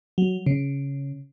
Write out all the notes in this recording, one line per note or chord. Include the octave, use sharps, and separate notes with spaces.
F#3
C#3